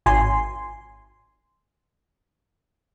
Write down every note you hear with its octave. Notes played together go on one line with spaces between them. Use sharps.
G#1 G#5 C6